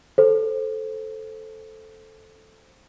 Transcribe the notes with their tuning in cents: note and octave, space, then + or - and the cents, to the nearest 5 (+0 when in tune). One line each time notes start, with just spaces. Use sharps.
A4 +0 C5 +5